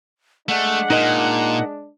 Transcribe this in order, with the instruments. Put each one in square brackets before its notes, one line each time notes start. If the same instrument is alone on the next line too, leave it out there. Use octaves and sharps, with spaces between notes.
[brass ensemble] G#3 D4 [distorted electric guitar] A3 [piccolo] F#5
[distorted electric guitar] A#2 [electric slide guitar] D#4 A#4 D#5